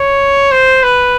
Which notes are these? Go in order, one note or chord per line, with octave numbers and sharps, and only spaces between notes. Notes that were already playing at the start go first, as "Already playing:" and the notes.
Already playing: C#5
C5
B4